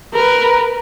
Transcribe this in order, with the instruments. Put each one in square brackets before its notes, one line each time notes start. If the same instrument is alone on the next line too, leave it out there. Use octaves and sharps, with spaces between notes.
[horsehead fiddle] A#4 B4